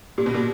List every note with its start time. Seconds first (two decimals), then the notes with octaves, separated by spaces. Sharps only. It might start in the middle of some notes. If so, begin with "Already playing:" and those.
0.18 A#2 G4
0.26 B2
0.34 A#2